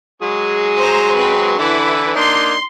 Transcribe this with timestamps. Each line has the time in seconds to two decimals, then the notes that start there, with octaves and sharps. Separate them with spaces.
0.22 F#3 G#3 G#4
0.78 C5 A#5
1.14 C4 B4
1.59 D3 E3 E4 B4
2.16 A#3 D4 D#4 C6